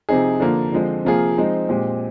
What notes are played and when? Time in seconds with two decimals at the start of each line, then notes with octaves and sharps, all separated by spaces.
0.09 C3 F3 C4 D#4 G#4
0.40 D3 F3 A#3
0.72 D3 F3 G#3 C4
1.05 C3 F3 A#3 F4 G#4
1.36 F3 G#3 C4 D#4
1.69 A#2 G#3 C4 G4